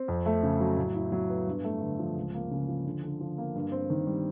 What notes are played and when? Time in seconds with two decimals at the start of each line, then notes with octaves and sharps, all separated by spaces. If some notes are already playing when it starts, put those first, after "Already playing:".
Already playing: C4
0.08 F2
0.26 A3
0.43 C#3
0.60 F#3
0.77 A2
0.95 E4
1.12 F#3
1.30 B3
1.47 G2
1.64 A3
1.81 D3
1.99 F3
2.17 C#2
2.34 A#3
2.51 C#3
2.68 F3
2.86 D3
3.03 D3
3.20 F3
3.38 A#3
3.55 G2
3.72 C4
3.90 D#3
4.07 G3